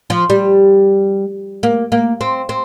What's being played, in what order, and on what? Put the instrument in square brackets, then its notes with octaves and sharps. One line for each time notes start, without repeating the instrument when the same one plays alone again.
[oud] F3
G3
A#3
A#3
C4
C4